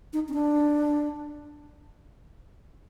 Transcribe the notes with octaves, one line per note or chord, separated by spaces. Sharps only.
D#4
C#4
D4